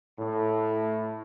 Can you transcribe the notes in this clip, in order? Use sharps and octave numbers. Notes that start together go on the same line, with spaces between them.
A2